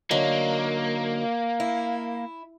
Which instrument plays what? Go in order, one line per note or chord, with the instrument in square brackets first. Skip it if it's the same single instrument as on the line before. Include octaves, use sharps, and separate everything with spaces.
[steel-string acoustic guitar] D3 F#3 D#4 [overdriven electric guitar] A#3
[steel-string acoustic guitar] E4